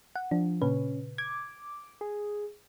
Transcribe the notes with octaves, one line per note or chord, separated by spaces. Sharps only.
F#5
F3 D4
A#2 C#3 C#4 B4
D6 G#6
G#4